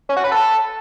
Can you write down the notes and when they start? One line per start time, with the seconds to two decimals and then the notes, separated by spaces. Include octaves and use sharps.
0.09 C#4
0.17 F#4
0.24 B4
0.32 A4